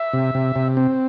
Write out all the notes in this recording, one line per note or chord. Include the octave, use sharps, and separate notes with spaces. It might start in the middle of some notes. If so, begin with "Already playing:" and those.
Already playing: E5
C3
C3
C3
C4